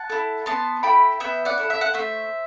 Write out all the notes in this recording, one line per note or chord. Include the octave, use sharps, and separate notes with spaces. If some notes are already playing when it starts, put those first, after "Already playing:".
Already playing: F#5 A5
E4 A4
B3 A5 C6
E4 A4 G5 B5
B3 E5 G5
D5 F#5
E4 A4
E5
F#5
A3 C5 E5